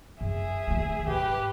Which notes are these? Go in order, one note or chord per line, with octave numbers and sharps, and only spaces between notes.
F#2 G#4 E5
D#3 A3
G#2 G4 B4